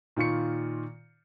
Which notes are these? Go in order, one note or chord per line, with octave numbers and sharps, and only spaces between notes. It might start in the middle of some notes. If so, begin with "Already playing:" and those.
A#2 D#3 F4 C#6 C#7